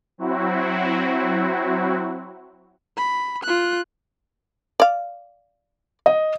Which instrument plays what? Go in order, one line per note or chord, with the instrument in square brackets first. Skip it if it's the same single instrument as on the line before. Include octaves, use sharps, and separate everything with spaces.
[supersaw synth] F#3 C4 E4 F#4
[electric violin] B5
F4 F#6
[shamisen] D5 F5
[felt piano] D#5